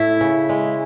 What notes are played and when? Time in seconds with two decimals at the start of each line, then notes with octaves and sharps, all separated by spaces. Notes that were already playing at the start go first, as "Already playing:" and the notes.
Already playing: A2 E4
0.21 C#3
0.49 G#3